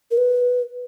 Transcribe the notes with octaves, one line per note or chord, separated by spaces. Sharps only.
A#4
B4